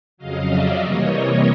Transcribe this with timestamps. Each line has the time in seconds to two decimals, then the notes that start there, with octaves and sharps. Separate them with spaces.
0.17 F2 C#3 F#3 D#5 F5
0.47 D5 E5
0.78 C3 E3 G3 A#3 C#5 D#5